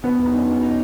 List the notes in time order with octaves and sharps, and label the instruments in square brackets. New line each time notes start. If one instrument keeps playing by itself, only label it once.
[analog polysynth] B2 [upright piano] B3
[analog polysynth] E2
[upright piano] D#4
[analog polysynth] B2 [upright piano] C#4
[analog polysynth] B2
D#4